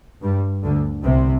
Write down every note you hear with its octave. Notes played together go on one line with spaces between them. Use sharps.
G2 G3
D2 D3
C2 C3